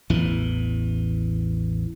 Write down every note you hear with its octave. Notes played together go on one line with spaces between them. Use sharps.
A1 E2 E3